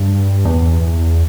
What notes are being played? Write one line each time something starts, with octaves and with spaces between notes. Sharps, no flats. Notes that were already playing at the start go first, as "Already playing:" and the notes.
Already playing: G2
E2